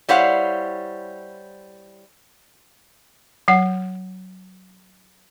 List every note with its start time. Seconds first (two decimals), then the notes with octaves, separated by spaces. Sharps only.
0.09 G3 E4 C5 C#5 F5 F#5
3.48 F#3 F#5